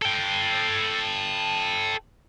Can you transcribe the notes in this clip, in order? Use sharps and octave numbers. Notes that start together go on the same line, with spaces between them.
A4 G5